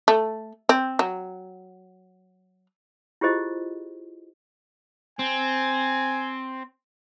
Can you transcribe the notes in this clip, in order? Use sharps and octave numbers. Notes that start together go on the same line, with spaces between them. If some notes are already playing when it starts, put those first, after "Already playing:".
A3
C4
F#3
E4 F4 G4 G#4 C5 D#5
C4 G#5